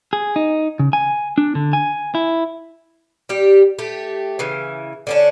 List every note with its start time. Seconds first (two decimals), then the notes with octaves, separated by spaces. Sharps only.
0.13 G#4
0.36 D#4
0.79 C#3
0.93 G#5
1.38 D4
1.55 D3
1.73 G#5
2.15 E4
3.29 G3 G4
3.79 A3 G4
4.39 C#3 E3
5.07 D3 C#4 D4